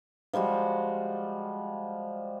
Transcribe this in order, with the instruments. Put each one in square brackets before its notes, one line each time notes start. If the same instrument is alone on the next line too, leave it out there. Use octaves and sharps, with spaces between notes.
[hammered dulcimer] F3 G3 G#3 F#4